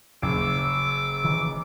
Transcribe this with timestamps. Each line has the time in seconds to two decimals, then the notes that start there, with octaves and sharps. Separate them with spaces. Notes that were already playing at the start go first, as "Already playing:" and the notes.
0.22 F#1 D6 E6
1.24 D#3 E3